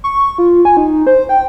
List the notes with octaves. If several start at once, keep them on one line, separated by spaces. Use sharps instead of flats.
C#6
F4
G#5
D#4
C5
G5